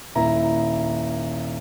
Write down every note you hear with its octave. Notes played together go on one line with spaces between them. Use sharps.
D#1 E4 A#5